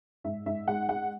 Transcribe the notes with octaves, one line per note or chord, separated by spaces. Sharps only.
G#2 E5
G#2 E5
G#3 F#5
G#3 F#5